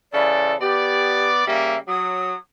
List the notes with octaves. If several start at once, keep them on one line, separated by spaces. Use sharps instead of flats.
C#3 E3 A4 D5
B3 G4 D5
C#3 G3 A#3 E5
F#3 D#6